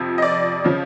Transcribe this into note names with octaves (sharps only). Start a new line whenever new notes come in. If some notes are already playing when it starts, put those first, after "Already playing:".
Already playing: F2 C3 F3
D#5
D5
C#3 F3